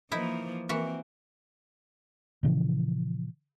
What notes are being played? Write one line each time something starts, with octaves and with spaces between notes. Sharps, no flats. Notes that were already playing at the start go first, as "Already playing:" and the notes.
E3 F3 A#3 D#4 E4
E3 A#3 C4 F#4
A#2 C#3 E3 F3